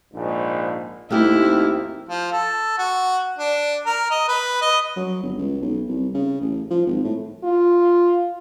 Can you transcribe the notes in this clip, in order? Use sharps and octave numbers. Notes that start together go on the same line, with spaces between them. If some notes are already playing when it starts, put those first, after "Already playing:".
A#1 G#2
G#1 D#2 A3 C4 E4 G4
F3
A4
F#4
D4
A#4
D#5
B4
D#5
F#3
G1
C#2
B1
C2
C#3
A1
F3
G#1
A2
F4